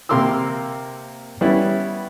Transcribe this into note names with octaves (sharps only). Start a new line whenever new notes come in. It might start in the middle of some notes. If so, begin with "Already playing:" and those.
C3 A#3 A#4 C6 D6 E6
G3 B3 C#4 E4